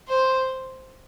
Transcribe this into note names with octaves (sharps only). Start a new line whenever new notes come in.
C5